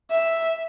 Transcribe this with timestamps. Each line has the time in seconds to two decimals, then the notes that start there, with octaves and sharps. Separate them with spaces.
0.11 E5